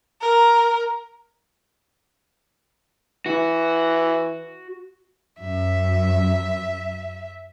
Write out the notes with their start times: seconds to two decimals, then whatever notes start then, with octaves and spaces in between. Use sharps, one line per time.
0.21 A#4
3.26 E3 F#4
5.41 F#2 E5